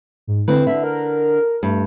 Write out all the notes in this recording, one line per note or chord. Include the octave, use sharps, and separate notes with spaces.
G#2
D3 C4 E4 B4
D3 E5
A#4
G2 A3